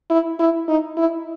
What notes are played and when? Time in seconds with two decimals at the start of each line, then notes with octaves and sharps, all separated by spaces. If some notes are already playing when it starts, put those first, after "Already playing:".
0.10 E4
0.39 E4
0.68 D#4
0.97 E4